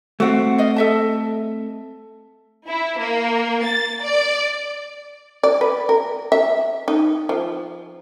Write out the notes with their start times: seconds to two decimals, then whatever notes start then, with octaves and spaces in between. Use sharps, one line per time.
0.20 A3 C4 F#4 F#5
0.58 D5 D#5 F5
0.76 A4 E5 A5
2.66 E4
2.99 A#3
3.64 A6
4.02 D5
5.43 D5
5.61 B4
5.89 A#4
6.32 E5
6.88 D#4
7.29 F3